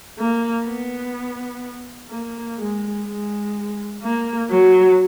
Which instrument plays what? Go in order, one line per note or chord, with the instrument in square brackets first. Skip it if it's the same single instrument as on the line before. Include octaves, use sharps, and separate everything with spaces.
[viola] A#3
B3
A#3
G#3
G#3
A#3
F#3